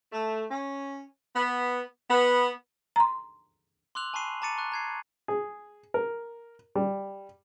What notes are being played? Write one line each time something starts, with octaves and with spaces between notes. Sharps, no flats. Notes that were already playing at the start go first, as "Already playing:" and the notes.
A3
C#4
B3
B3
A#5 C6
C6 D6 E6 F#6 F7 F#7
G#5 A5 B5 C#6 C7 D#7
A5 A#5 D6 A6 C#7 D#7
C#6 F#6
A#5 G#6 C7
G#4
A#4
G3